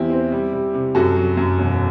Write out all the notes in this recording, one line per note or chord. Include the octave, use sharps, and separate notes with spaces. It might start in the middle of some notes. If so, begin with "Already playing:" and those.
Already playing: E2 C4 E4 G4
C4
G3
G3
C3
F#2 F#4 A4
F#3
F#2
E1